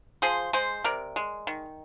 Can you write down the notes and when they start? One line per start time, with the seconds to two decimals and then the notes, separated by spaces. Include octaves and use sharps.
0.22 F3 G#4 C5
0.53 G#3 G#4 C5
0.84 C3 A#4 D5
1.16 G#3
1.47 D#3